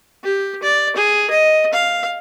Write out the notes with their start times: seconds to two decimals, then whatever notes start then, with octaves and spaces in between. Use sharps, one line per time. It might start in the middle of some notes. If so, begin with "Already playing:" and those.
0.23 G4
0.63 D5
0.96 G#4
1.30 D#5
1.73 F5